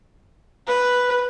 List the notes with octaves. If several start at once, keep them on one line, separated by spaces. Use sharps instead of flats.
B4